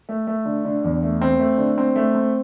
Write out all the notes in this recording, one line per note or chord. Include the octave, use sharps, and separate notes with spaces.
A3
A3
D3
D3
E2
A3
C4
A3
D3
C4
A3
C4